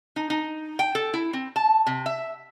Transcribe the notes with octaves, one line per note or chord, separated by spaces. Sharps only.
D#4
D#4
G5
A4
E4
C4
A5
C3
E5